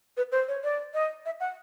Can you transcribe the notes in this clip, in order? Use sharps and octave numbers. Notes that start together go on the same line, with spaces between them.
B4
C5
C#5
D5
D#5
E5
F#5